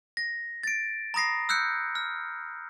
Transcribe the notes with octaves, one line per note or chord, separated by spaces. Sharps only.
A#6
A6 D7
A#5 B5 D#6 A#6 C7
E6 F#6 G6 C#7
F6